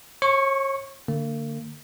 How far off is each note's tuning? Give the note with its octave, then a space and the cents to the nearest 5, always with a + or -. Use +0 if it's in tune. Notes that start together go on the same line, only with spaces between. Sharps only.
C#5 -35 C#6 +0
D3 +0 A#3 -40